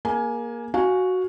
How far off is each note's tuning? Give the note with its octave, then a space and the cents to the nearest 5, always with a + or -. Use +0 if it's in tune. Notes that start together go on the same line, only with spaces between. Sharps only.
A#3 +15 G#4 +0 G#5 +15
F#4 +0 F5 +25 G#5 +0